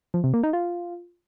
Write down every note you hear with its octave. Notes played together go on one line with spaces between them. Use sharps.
F3
C3
A#3
D#4
F4